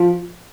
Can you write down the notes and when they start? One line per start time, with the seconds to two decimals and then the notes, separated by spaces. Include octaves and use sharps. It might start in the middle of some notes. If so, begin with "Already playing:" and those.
Already playing: F3